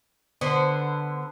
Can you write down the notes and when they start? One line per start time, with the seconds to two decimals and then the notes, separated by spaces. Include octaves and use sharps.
0.41 D3 B3 C5